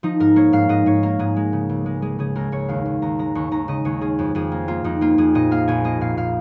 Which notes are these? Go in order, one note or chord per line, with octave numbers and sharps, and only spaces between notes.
F3 D#4
G#2 A#4
A#3 C#5
G#2 F5
G#2 D#5
G#2 C#5
A#3 A#4
G#2 G#4
G#3
C#3
C#2
G#3
G#3 G#4
C#3 G#4
C#2 A#4
C#2 C#5
D#2 F5
D#2
D#2 A#5
G#3 A#5
D#2 C#6
D#2 A#5
C#3 D#5
D#2 C#5
A#3 G#4
F2
F2 G#4
A#3
A#3 F4
F2 D#4
A#3 F4
F2 G#4
A#2 D#5
A#3 F5
A#1 G#5
A#3 D#5
A#2 F5
A#2 F5